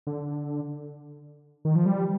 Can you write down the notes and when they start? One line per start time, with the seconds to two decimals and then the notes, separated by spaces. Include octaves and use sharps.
0.07 D3
1.65 D#3
1.75 F3
1.86 G3